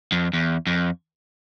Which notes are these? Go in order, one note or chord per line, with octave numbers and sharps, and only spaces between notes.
F2
E2
F2